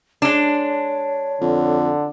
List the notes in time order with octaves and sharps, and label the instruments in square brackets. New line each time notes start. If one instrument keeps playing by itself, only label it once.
[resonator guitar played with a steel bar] G#3 D4 [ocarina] C#5
[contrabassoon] F2 [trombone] D3